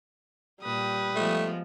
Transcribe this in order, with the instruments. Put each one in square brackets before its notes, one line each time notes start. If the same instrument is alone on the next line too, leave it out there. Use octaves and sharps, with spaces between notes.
[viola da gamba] A#2 [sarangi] G3 [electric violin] B4 D#6
[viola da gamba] F3 G#3 B3 [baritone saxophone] A3